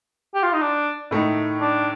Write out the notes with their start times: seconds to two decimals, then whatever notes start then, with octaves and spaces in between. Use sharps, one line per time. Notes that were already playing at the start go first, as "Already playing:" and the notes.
0.35 G4
0.43 F4
0.53 D#4
0.62 D4
1.11 A2 A3 D#4
1.61 D4